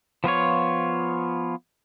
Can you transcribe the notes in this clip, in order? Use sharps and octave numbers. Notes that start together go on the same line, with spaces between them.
F3 B3 F4 C#5